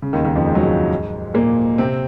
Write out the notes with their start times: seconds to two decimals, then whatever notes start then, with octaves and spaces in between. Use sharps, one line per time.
0.02 C#3
0.13 D#2 D#3
0.24 D#2 D#3
0.36 F2 F3
0.47 G#3
0.55 F#3
0.62 G#2 G#3
1.34 A#2 A#3
1.78 C3 C4